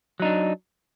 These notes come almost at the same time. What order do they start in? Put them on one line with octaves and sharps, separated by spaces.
F#3 D#4 D4